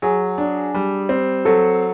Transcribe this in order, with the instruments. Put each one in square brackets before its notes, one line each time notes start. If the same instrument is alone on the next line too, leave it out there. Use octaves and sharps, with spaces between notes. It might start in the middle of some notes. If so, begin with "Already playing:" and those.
[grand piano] F#3 [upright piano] G#4
[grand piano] D4
G3
C4
[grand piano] F#3 [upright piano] A4